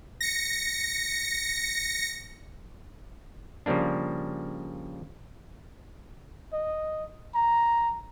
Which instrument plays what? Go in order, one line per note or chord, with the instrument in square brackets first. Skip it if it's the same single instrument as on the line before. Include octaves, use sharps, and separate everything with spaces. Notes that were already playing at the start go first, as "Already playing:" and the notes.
[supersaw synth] A#6 C#7
[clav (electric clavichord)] C#3 F3 G3 A#3 D4
[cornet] D#5
A#5